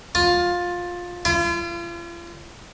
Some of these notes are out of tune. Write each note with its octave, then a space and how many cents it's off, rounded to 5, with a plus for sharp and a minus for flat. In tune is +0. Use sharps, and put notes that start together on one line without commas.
F4 +15
F4 -40